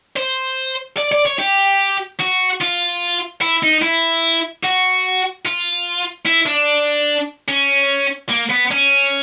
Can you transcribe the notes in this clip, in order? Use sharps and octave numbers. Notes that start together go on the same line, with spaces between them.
C5
D5
D5
C#5
G4
F#4
F4
E4
D#4
E4
F#4
F4
E4
D4
C#4
A#3
B3
C#4